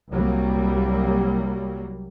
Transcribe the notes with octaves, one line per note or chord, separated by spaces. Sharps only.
C2 F#3 G3 A#3